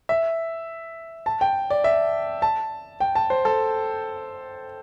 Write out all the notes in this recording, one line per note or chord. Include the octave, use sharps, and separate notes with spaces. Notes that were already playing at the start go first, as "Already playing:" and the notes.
E5
A5
G5
D5
E5
A5
G5
A5
C5
A4